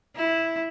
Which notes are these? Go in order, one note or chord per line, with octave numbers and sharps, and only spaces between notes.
E4